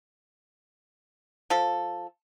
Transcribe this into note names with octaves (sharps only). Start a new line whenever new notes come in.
F3 A4